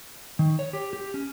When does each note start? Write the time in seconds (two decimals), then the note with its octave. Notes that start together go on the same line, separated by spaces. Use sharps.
0.39 D#3
0.59 C#5
0.73 G4
0.93 G4
1.14 C#4